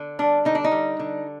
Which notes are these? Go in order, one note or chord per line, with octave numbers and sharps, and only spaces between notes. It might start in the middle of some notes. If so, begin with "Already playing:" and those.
Already playing: D3
G3 D4
D3 D#4
D4
D#4
G3
D3